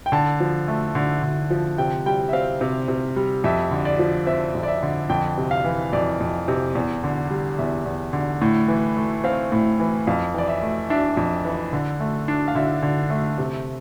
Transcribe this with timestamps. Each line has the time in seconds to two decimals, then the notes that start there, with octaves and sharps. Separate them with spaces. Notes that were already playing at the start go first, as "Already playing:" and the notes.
0.06 G5
0.12 D3 A5
0.40 F3
0.68 A3
0.95 D3
1.22 D3
1.50 F3
1.78 C3 G5
2.06 G3 G5
2.29 E5
2.33 C4 F5
2.61 C3
2.88 C3
3.16 G3
3.44 F2 E5
3.71 D3
3.85 D5
3.99 F3
4.26 C4 E5
4.55 F2
4.63 D5
4.68 E5
4.83 D3
5.09 F2 G5
5.37 C3
5.51 F5
5.65 E3
5.93 F2 D5
6.20 F2
6.48 C3
6.75 E2
7.04 D3
7.30 G3
7.58 E2 E5
7.86 E2
8.13 D3
8.42 A2
8.68 E3
8.97 A3
9.24 C4 F5
9.52 A2
9.80 E3
10.07 F2 F5
10.34 E3 D5
10.48 E5
10.62 A3
10.90 D4 E5
11.17 F2
11.45 E3
11.73 D3
12.00 A3
12.28 D4
12.48 F5
12.55 D3 E5
12.82 D3
13.10 A3
13.38 C3